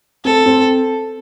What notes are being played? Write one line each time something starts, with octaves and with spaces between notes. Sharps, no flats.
C4 A4
C4